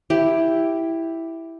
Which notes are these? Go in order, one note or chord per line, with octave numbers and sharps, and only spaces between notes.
E4 G4